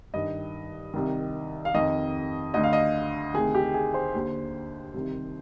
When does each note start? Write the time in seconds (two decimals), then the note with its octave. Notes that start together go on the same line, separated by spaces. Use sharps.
0.14 G2 D#3 D#5
0.94 C2 C3 D#3
1.65 F5
1.74 F2 D#3 D#5
2.54 D2 D3 D#5
2.63 F5
2.73 D#5
3.34 D2 C3 D#3 G#4
3.55 G4
3.74 G#4
3.94 C5
4.14 D#2 D3
4.94 C2 C3 D#3